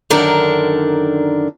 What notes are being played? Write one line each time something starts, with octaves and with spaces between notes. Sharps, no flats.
F#2 D3 D#3 D4 A#4